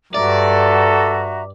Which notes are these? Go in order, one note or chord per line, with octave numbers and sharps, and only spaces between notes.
G2 F#4 A4 D5 E5 A#5